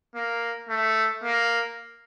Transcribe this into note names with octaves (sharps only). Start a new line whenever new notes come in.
A#3
A3
A#3